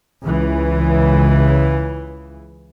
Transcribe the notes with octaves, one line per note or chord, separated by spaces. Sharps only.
C#2 C#3 E3